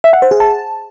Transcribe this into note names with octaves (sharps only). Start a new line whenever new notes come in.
E5
F#5
C5
G#4
A5